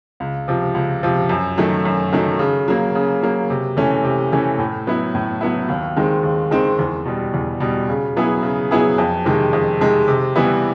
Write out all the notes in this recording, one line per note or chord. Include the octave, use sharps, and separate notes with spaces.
C#2
C3 F3
C#2
C3 F3
F#2
D#3 F#3 A3
F#2
D#3 F#3 A3
C#3
F#3 A#3
C#3
F#3 A#3
C3
E3 A3 C#4
C3
E3 A3 C#4
A2
F#3 B3 E4
A2
F#3 B3 E4
D#2
D#3 G#3 C4
D#2
D#3 G#3 C4
E2
B2 G3
E2
B2 G3
C#3
F#3 B3 E4 G#4
C#3
F#3 B3 E4 G#4
F2
C3 D#3 G#3
F2
C3 D#3 G#3
C3
E3 G3 B3 E4